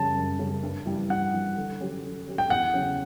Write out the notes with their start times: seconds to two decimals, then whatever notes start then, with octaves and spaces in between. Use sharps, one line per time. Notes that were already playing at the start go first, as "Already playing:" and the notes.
Already playing: F#2 C#3 G3 C#4 A5
0.16 F#2
0.39 C#3 G3 C#4
0.63 G2
0.86 E3 G3
1.10 G2 F#5
1.33 E3 G3
1.57 D3
1.81 F#3 C#4 G4
2.03 D3
2.27 F#3 C#4 G4
2.38 G5
2.50 E2 F#5
2.74 C#3 F#3 C#4